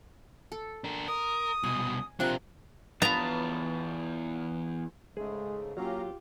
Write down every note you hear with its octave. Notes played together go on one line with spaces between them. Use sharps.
A4
D4 A#4
A#4 D#6
C2 B2 G#5
C3 F3 C4 D4 A#4 F#6
E2 B3 F4 A5 A#5
G#2 C#3 G#3 A3 G#4
F#3 A#3 C#4 F4 G4 F5 A#5